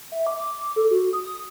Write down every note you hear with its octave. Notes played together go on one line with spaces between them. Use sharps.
E5
D6
A4
F#4
D#6